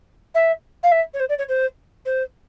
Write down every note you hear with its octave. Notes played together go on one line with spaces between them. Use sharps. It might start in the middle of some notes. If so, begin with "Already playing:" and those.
E5
F5
E5
C#5
C5
D5
C#5
C5
C5